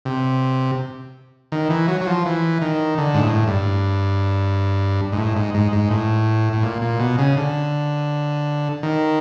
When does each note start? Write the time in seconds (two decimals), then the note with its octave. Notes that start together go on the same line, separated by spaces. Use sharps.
0.05 C3
1.52 D#3
1.70 E3
1.88 F#3
2.01 F#3
2.07 F3
2.25 E3
2.62 D#3
2.98 D3
3.14 G#2
3.22 A2
3.47 G2
5.12 G#2
5.17 A2
5.36 G#2
5.54 G#2
5.72 G#2
5.90 A2
6.53 A2
6.63 A#2
6.82 A#2
7.00 B2
7.19 C#3
7.37 D3
8.83 D#3